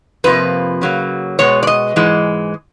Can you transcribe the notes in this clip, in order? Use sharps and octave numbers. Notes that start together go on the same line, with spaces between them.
F2 C3 F3 A#3 B4
C#3 F#3 A#3
B2 G#3 B3 C#5
D5
D#5
G#2 E3 G#3